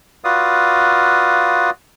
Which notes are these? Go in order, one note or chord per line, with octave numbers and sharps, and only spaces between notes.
F4 F#4 B4 D5 F5 D#6